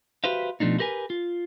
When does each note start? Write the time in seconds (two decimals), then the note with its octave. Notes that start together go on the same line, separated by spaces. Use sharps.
0.24 F#4 G4 B4 C5 E5 F5
0.60 B2 F3 A3 D4 D#4
0.79 E4 G4 A#4 B4 G#5
1.10 F4